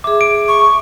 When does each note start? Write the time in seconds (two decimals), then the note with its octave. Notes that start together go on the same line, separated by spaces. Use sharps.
0.04 G#4 E5 D6
0.21 D7
0.48 C#6